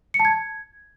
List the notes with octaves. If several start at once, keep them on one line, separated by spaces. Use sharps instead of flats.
C#7
A5
G#6